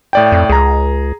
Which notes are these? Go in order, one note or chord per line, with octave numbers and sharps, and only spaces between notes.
A2 D5 G5
F2
C#2 G#4 A#5